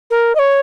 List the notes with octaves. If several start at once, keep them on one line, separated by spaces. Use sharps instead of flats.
A#4
D#5
C#5